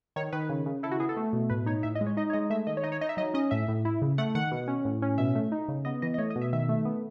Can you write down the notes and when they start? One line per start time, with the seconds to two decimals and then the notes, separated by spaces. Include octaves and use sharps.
0.16 D#3 C#5
0.33 D#3 B4
0.49 C#3
0.66 C#3
0.83 E4 A4
0.91 F#4
1.00 B3 G#4
1.09 A4
1.17 A3
1.33 B2
1.50 A2 B4
1.66 D#4 C#5
1.83 A2 E5
1.95 D#5
2.01 G#3
2.07 C#5
2.17 D#4 D#5
2.30 C#5
2.33 G#3 D#5
2.50 A3 E5
2.67 D#3 D#5
2.77 C#5
2.84 D#4 D#5
2.92 C#5
3.01 D#4 D#5
3.09 E5
3.17 F#3 D#5
3.34 C#4 D#5
3.51 A2 E5
3.68 A2
3.85 E4
4.02 C#3
4.18 A3 F#5
4.35 D#3 F#5
4.52 B2
4.68 C#4
4.85 A2
5.02 C#4
5.18 B2 E5
5.35 A3
5.52 D#4
5.68 C#3
5.85 B3 D#5
6.02 E3 D#5
6.14 D#5
6.18 A3 C#5
6.30 D#5
6.36 B2
6.41 E5
6.53 D#3 E5
6.69 A3
6.85 B3